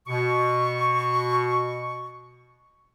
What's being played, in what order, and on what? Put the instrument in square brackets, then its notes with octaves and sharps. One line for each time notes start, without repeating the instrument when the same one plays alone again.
[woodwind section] B2 C#6